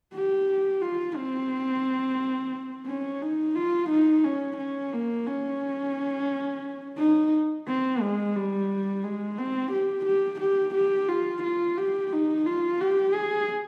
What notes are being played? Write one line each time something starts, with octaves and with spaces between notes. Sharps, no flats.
G4
F4
C4
C#4
D#4
F4
D#4
C#4
C#4
A#3
C#4
D#4
C4
G#3
G3
G#3
C4
G4
G4
G4
G4
F4
F4
G4
D#4
F4
G4
G#4